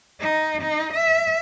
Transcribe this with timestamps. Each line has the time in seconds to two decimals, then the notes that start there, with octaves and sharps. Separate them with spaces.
0.21 D#4
0.62 D#4
0.94 E5